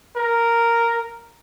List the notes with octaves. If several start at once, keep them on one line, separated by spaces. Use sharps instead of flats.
A#4